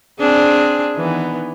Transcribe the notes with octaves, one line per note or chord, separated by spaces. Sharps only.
C4 D4 G#4
D#3 E3 B3